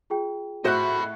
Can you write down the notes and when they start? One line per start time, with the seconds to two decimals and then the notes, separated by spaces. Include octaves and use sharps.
0.10 F4 G#4 G5
0.64 A2 F#4 C5 D#5 E5 F#5 B5 F#6